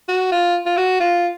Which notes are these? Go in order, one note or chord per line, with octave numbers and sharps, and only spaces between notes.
F#4
F4
F4
F#4
F4